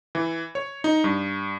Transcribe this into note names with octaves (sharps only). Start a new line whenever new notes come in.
E3
C#5
D#4
G2